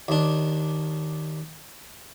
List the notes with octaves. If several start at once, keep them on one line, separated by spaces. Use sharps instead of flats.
D#2 D4